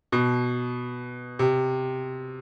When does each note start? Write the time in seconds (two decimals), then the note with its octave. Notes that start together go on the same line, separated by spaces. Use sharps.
0.12 B2
1.39 C3